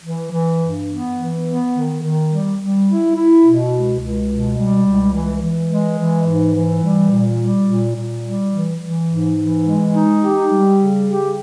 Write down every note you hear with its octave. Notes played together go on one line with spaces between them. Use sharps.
E3
E3
G2
B3
E3
B3
D#3
D#3
G3
G3
E4
E4
B2
C#2
C#2
B2
G3
C#2
E3
E3
G#3
E3
G#2
E3
G3
A#2
G3
A#2
A#2
G3
E3
E3
G#2
E3
G#3
D#4
G4
G3
C#3
G4